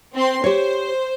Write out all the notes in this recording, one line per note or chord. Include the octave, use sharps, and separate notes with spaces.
C4 C6
G4 C5 C#5